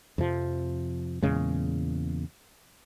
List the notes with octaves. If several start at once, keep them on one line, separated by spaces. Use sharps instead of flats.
F2 C3 F3
E2 A#2 C#3 G#3